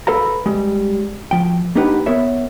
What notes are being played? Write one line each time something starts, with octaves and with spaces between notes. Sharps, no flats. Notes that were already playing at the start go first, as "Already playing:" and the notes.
A4 B4 F5 A#5
G3 G#3
F3 G5
A#3 D4 D#4 G4 B4 F#5
B3 A#4 C#5 E5